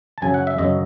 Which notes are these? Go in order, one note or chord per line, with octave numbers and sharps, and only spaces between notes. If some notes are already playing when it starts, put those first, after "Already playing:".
A5
F#2 C#3 F#3 G#5
F#5
E5
F#2 C#3 F#3 D#5